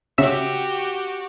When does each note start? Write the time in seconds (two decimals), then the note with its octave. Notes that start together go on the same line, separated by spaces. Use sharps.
0.18 C#3 F#4 G4 E5 E6